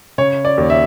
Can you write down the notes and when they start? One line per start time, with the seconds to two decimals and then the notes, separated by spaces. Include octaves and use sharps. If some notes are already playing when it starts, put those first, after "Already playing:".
0.18 C#3 C#5
0.45 D5
0.58 D#2
0.70 E5